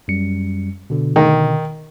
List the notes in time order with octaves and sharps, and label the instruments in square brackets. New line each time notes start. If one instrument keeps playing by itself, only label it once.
[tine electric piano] F#2 G3 C#7
B2 D3
[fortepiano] D#3